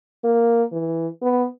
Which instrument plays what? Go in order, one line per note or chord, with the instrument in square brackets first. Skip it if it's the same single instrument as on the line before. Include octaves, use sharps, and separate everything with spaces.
[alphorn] A#3
E3
B3